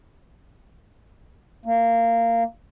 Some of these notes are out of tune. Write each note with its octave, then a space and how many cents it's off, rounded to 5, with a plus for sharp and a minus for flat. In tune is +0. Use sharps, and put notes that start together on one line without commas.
A#3 -20